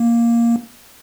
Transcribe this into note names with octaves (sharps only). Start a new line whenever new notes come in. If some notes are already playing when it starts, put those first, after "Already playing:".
Already playing: A#3